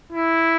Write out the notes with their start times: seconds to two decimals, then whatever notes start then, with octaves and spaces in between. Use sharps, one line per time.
0.12 E4